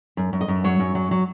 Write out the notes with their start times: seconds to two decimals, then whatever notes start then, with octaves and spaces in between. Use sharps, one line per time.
0.17 F#2
0.33 F#2
0.41 D#5
0.48 F#2
0.64 F#3 C#5
0.80 F#2
0.95 F#3
1.11 F#3